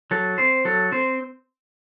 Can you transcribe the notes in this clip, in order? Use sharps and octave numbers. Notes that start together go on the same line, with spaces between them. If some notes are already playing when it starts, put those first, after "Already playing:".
F#3 A4
C4 C5
F#3 A4
C4 C5